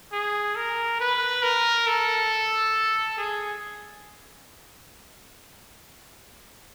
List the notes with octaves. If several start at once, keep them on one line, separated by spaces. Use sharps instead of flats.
G#4
A#4
B4
A#4
A4
G#4